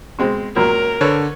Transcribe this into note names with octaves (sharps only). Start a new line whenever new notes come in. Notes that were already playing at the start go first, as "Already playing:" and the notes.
B2 G#3 C4
C#2 A#2 F#3 A#4
D3 A4 B4 C#5